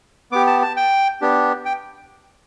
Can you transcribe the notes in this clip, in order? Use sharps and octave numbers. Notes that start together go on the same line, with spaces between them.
B3 G4 D6
A5
A5
G5
B3 D4 G4
G5